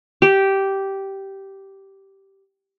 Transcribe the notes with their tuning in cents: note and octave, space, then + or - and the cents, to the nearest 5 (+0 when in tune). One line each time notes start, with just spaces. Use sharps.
G4 -10